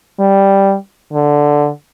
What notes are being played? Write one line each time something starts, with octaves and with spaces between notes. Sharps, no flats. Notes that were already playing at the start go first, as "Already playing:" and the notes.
G3
D3